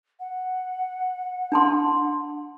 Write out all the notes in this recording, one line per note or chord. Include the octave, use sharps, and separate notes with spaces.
F#5
D4 A5 C6